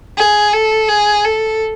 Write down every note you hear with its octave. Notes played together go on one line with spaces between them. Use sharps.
G#4
A4
G#4
A4